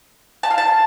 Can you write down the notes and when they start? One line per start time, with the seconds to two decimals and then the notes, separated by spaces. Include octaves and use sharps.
0.43 A5
0.51 F5
0.58 A5